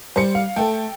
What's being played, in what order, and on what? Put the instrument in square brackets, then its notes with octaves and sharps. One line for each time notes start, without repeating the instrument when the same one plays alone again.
[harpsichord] G3 [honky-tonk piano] C5 C#7
[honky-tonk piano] F5
[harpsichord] A3 [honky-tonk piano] A4 G5